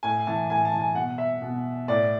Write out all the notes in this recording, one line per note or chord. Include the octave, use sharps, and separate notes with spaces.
A2 G#5
E3 A5
A2 G#5
A5
E3
G#5
B2 F#5
E5
B2
A2 D5